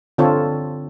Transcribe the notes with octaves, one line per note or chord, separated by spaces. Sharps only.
D3 C4 F4 A4 C#5